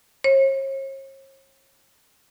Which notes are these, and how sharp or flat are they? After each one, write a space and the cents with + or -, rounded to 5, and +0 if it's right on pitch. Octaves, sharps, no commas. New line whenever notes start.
C#5 -45